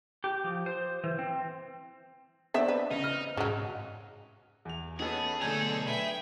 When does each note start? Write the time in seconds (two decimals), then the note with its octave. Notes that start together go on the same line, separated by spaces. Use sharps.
0.24 G4
0.44 F3
0.66 C5
1.04 E3
1.19 C4
2.54 D#3 B3 C4 D4 E5
2.68 B4
2.91 C#3 D#4
3.04 F6
3.37 C2 G#2 C#3 F#3
4.65 E2 F7
5.00 B3 C#4 D#4 G#4 A4
5.42 B1 D3 A3 A4 G#5 A#5 G6 G#6
5.88 B4 E5 G5